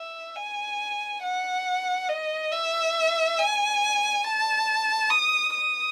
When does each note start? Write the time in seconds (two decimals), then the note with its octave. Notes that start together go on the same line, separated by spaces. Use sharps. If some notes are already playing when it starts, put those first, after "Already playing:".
Already playing: E5
0.36 G#5
1.23 F#5
2.09 D#5
2.52 E5
3.39 G#5
4.24 A5
5.10 D#6
5.54 D#6